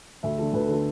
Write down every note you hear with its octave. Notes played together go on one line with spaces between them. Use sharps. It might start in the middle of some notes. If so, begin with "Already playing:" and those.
D2 E5
D3 A3 A4
D2 B4
D3 A3